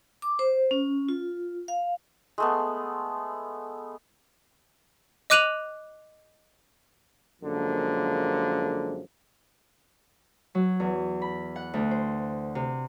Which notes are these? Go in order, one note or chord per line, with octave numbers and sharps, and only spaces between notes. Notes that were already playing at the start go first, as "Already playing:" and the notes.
D6
C5
C#4
F4
F5
G#3 A3 B3
D#5 D6 F#6 D#7 F7 F#7
F#2 D3 F3 G#3 A#3
F#3
E2
B5
F#5
D2
C5
C3